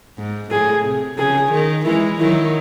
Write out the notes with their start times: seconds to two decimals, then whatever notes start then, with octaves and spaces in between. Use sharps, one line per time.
0.18 G#2
0.51 A2 G#4
0.85 C3
1.18 C#3 G#4
1.52 D#3
1.86 E3 G#3 E4
2.20 D#3 F#3 E4